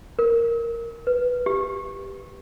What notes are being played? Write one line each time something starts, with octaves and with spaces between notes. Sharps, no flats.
A#4
B4
G4